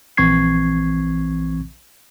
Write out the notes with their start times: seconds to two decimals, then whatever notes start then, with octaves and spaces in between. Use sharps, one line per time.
0.17 A#1 E3 C4 C#6 G#6 C7